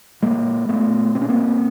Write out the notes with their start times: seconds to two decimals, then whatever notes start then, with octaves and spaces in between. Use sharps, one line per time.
0.22 A#2 G#3 A#3
0.69 A#2 A3 B3
1.15 B2 C4
1.21 C#4
1.29 A#3 C4